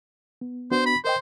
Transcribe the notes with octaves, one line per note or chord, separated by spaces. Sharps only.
B3
B3 D4 F#4 C5
B5
A#4 C5 D#5 G5